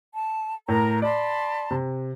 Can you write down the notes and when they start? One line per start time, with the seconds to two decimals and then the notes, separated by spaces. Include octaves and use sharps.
0.15 A5
0.68 A2 A#4 A#5
1.02 D5 A5 B5 C6
1.71 C3